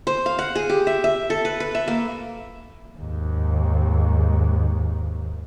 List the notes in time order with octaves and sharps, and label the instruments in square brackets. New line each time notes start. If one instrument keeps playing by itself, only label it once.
[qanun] C5
F5
F#5
G#4
G4
E5
E5
A4
B4
B4
E5
A#3
[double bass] D#2 G#2